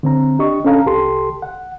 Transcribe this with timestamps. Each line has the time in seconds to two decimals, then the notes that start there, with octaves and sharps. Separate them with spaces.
0.03 D3 C4 A#5
0.39 D4 G4 D#5 C#6
0.65 C#4 D4 A4 F5 A#5
0.86 C2 G4 A4 C6
1.42 F#5